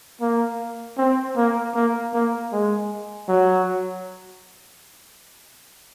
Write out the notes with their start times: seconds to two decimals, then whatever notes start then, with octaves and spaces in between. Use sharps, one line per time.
0.21 A#3
0.98 C4
1.37 A#3
1.74 A#3
2.13 A#3
2.52 G#3
3.29 F#3